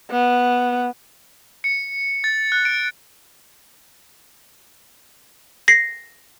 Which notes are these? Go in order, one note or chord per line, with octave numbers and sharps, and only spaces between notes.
B3
C#7
A6
F#6
D7
A#6 C7